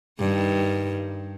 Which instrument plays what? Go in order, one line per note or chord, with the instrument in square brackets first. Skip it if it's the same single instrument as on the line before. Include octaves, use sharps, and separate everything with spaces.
[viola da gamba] G2 D#3